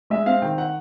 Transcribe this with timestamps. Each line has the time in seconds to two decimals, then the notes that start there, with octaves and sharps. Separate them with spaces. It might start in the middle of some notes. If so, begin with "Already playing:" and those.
0.10 G#3 E5
0.26 C4 F5
0.42 D#3 G5
0.58 F#5